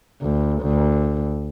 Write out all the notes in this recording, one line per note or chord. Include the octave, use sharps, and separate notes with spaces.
D2
D2